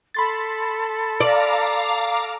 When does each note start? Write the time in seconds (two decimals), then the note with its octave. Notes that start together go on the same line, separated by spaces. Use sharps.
0.14 A4 A5 B5 C6 A6
1.20 D5 F5 A#5 D6